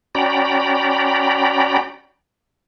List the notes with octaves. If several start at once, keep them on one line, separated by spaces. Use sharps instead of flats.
C#4 F#4 D5 G5 A#5 B5